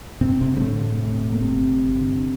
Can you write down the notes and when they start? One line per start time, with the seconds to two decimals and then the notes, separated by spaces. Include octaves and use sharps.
0.21 G2 C3 C4
0.37 G1 C3 C4
0.51 D3
0.57 G3
0.60 A2 A3
0.66 D3
0.81 E2
0.96 C3
1.11 E1
1.26 C3
1.33 A#3
1.40 G1 C3 C4
1.55 G1
1.70 G1
1.85 G1
2.00 D3
2.15 D3